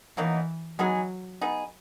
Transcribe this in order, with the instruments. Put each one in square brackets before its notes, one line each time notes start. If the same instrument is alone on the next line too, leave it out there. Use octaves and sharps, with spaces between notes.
[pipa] B2 F#3 A#3 D#4 [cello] E3
[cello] F#3 [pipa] G#3 B3 D#4 G#4
[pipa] B3 D#4 G#4